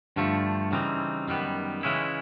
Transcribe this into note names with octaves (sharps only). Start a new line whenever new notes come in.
G2 D3 F3 A3
C#3 E3 G3 C4 D#4
F#2 D#3 G3 B3
C#3 E3 G#3 C#4 E4